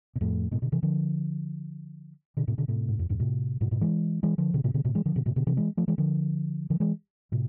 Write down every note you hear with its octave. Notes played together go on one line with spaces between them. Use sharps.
B2
F2 A2
G#2 B2
B2 D3
C3 E3
D3 F3
B2 D3
A2 C3
B2 D3
A2 C3
G#2
F2
E2 G#2
A2 C3
G#2 B2
G#2 B2
E3 G#3
E3 G#3
D3 F3
B2 D3
A2 C3
B2 D3
A2 C3
E3 G#3
D3 F3
B2 D3
A2 C3
B2 D3
C3 E3
E3 G#3
F3 A3
E3 G#3
D3 F3
D3 F3
E3 G#3
A2 C3